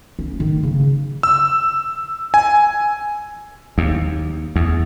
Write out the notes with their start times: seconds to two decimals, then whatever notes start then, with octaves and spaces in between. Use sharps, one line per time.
0.19 C#4
0.40 D#3
0.63 C#3
1.23 E6
2.34 G#5
3.78 D#2
4.56 E2